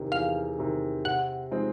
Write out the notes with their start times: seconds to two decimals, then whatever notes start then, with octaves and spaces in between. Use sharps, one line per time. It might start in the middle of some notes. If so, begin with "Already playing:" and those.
Already playing: E2 C3 D#3
0.12 E2 F5
0.58 C3 D#3
1.05 C3 F#5
1.51 F3 G#3 C4 D#4